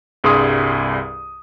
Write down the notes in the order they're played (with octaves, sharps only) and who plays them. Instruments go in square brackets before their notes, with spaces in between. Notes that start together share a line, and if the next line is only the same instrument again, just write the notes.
[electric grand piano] C2 G2 G#4 C6 D#6